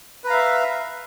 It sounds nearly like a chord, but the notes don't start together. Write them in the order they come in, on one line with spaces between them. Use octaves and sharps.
B4 A#5 F5 E5